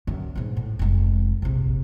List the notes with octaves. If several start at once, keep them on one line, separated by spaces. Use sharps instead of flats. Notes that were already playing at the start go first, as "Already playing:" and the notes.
F#2 D3
G#2 B2
A2
F1 G#3
A#1 C3